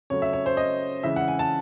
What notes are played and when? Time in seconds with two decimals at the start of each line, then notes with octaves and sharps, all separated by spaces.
0.10 C#3 F#3 A3 C#5
0.22 E5
0.33 C#5
0.46 C5
0.57 D#5
1.03 C#3 E3 G#3 E5
1.16 F#5
1.28 G#5
1.39 A5